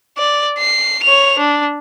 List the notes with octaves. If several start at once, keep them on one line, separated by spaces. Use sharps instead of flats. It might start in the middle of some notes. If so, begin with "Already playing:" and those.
D5
C7
C#5 F7
D4